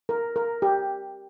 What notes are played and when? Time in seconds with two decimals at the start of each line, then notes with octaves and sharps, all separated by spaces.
0.09 A#4
0.36 A#4
0.62 G4